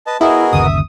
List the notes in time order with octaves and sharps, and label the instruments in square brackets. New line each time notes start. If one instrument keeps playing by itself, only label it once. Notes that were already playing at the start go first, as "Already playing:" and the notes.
[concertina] B4 D#5 [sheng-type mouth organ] A5
[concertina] B3 F#4 A#4 [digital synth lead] E4 [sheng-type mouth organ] G#4 D#5
[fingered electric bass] G1 D#2 C#3 [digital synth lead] D#6
[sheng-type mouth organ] E5